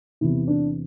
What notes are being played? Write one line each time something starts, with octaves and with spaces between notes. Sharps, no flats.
E2 C3 E3 E4
D4